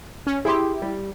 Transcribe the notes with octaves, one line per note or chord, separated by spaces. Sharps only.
C#4
E4 G4 G#4 G5 C6
G3